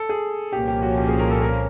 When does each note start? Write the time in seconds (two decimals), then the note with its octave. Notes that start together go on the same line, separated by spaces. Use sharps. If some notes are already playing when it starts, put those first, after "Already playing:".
Already playing: A4
0.09 G#4
0.52 C2 A#2 F3 A#3 C#4 G4
0.68 G4
0.82 F#4
0.97 G4
1.08 G#4
1.19 A#4
1.31 A4
1.42 A#4